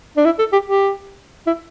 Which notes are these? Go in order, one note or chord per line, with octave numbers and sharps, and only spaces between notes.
D4
E4
A4
G4
G4
E4